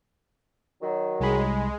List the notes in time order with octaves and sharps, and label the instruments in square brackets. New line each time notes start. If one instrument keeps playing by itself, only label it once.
[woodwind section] D#3 F#3
[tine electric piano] C2 B5 [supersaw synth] G#3